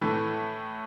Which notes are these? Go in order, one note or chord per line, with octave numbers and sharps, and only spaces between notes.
A2 E3 A3